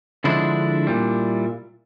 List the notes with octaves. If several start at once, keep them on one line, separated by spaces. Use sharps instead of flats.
D3 F3 G#3 D4 E4
A#2 G3